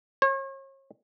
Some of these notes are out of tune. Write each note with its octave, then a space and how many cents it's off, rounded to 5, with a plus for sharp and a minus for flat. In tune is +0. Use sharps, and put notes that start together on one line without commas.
C#5 -40